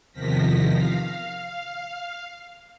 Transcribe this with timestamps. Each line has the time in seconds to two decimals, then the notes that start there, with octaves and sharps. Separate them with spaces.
0.13 E2 C3 D#3 F3 A#6 B6
0.73 F5